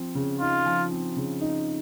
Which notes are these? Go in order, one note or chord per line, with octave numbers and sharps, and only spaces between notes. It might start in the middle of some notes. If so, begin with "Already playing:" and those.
Already playing: F3 C4
C#3
D#4 F4
F3
C4
C#3
D#4